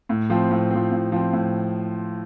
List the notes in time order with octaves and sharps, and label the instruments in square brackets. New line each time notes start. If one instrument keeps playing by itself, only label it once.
[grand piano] A2
F3 C4
A2
F3 C4
A2
F3 C4
A2